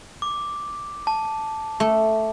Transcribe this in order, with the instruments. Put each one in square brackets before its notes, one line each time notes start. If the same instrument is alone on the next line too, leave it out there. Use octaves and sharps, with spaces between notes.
[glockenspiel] D6
A5
[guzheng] A3